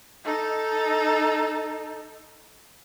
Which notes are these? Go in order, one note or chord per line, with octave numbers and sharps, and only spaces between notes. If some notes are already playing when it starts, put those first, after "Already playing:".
D#4 A4